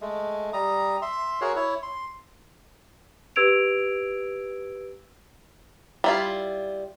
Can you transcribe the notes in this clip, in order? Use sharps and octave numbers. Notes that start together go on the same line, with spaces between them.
G#3 A3
G3 A#5 D#6
E5 C6
F#4 G#4 A#4 C#5
E4 C#5
C6
G4 B4 E6 G#6 D7 F7
G3 E4 F4